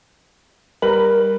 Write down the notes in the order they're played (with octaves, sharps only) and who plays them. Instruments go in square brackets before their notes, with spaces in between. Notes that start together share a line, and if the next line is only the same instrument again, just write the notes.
[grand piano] G3 B4 F#7 [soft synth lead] A#4